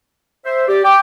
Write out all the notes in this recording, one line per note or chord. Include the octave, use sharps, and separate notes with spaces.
C5 E5
G4 D5
G5 D6